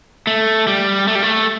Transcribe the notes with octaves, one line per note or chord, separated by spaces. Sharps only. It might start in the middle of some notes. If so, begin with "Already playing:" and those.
A3
G3
A3
G3
A3